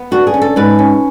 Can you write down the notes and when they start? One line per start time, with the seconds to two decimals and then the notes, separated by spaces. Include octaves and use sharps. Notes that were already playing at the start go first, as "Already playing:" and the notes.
Already playing: B3
0.11 D3 F#4
0.27 G#4
0.34 C#4
0.42 A4
0.56 G#2 B4
0.79 C#4